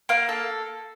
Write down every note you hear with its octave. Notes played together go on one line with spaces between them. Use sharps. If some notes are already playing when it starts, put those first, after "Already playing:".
A#3 F5
A4